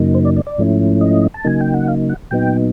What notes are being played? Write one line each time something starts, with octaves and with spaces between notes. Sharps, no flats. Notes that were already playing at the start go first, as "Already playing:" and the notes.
Already playing: F#2 C#3 F#3 A#3 D#4
C5
D5
D5
D5
G#2 F3 A3 C#4 E4
D#5
A5
C#3 F#3 A#3 D#4 G#5
G5
F#5
F5
F#5
A#2 F#3 B3 D#4 G5